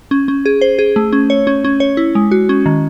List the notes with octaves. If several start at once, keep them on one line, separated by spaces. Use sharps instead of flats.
C#4
C#4
G#4
C5
G#4
A3
C#4
C#5
C#4
C#4
C#5
E4
G#3
F#4
C#4
D#3